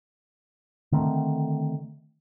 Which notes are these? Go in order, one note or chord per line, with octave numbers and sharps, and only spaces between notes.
D3 D#3 A3 C4